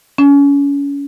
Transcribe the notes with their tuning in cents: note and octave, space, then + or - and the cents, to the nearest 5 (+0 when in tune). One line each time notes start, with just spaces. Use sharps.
C#4 +30